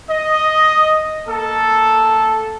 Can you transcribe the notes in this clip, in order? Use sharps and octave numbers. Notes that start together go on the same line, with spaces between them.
D#5
A#3 A4